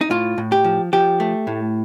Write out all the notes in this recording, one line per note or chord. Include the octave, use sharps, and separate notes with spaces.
D#4
A2 F4
A2
G4
F3
F3 G4
A3
A2